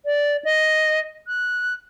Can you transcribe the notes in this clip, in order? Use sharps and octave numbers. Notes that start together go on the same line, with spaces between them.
D5
D#5
F#6